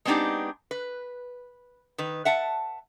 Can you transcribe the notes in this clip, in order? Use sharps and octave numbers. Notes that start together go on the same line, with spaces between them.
G#3 B3 C4 D4 D#4 G4
B4
D#3 B4
E5 F#5 A5